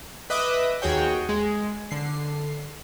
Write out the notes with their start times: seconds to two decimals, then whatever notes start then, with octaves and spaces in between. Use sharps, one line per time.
0.30 B4 D#5 E5 D6 D#6 F#6
0.82 D#2 F#4 G#4 C#5 G5
1.29 G#3
1.91 D3 C7